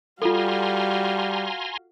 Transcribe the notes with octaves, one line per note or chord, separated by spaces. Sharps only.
G3 F4 F#4 A4 F5 G#5 A#5 C6